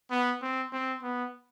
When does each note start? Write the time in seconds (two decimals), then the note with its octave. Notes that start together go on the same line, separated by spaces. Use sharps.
0.11 B3
0.42 C4
0.72 C4
1.03 B3